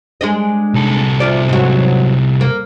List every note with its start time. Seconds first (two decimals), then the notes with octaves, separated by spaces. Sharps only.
0.21 G#3 D4 D#5
0.74 C2 A4
1.20 C3 F4 D5
1.49 G#2 F#3
2.41 A#3